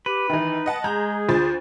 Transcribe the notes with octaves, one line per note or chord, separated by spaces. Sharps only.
G4 B4
D#3 E3 D#4
D#5 F#5 A5
G#3 G#4 A#5 G6
D2 F4 C5 A6